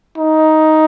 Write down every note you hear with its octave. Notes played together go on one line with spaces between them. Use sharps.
D#4